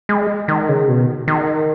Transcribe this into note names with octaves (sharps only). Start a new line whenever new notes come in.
G#3
D#3
C#3
B2
D#3